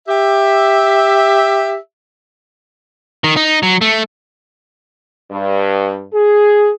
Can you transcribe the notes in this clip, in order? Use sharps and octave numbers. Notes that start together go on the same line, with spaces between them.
G4 E5
D#3
D#4
F#3
A3
G2
G#4